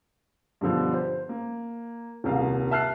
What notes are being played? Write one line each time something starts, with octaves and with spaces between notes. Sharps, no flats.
G2 B2 D3 F3
C5
A#3
D#1 C2 F5
E5 A5 F6 F#6 C7